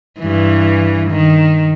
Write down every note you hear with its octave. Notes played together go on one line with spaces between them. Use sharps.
G2 E3
D#3